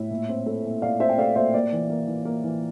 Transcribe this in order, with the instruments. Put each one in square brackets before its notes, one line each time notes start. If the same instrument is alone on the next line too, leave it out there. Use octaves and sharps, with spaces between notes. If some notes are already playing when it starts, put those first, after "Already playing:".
Already playing: [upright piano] A2 E5
A#2
C4
A3
A#2
A#2 D5 F5
C4 C5 E5
G5
A3 D5 F5
A#2 C5 E5
A#3 D5
E3
A#3
E3
A#3
E3